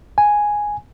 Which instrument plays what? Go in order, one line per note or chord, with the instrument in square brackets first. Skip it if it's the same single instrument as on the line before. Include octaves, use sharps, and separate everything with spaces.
[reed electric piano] G#5